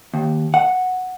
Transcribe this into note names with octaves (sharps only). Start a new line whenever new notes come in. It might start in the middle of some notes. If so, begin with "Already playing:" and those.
D#2
F#5